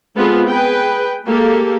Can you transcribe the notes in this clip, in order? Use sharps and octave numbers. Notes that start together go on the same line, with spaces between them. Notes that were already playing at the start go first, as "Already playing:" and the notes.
G#3 B3 C4 F4 G#4 A4
G#4 B4 G5
G#3 A#3 G4 A4